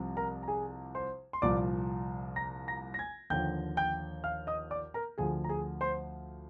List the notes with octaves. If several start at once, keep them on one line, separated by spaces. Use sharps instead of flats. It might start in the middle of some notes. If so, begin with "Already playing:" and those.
Already playing: C2 C3 F3
A#4 A#5
A#5
G#4 G#5
C5 C6
C6
C2 A#2 F3 D5 D6
A#5 A#6
A#5 A#6
A#6
G#5 G#6
D#2 D3 F3 G5 G6
G5 G6
F5 F6
D#5 D#6
D5 D6
A#4 A#5
D2 D3 F3 G#4 G#5
A#5
G#4 G#5
C5 C6